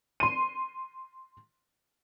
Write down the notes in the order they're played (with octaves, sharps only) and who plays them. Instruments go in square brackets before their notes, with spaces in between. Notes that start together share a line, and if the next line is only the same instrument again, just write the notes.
[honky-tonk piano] C6 D#7